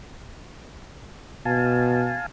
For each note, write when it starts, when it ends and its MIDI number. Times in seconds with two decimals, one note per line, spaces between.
1.45 2.17 47
1.45 2.26 77
1.45 2.26 80
1.45 2.26 81